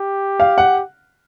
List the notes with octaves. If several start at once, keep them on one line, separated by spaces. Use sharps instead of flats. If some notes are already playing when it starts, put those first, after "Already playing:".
Already playing: G4
F5
F#5